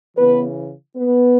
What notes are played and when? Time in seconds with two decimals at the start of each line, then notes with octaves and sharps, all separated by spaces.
0.16 C#3 E3 B3 B4
0.96 B3 B4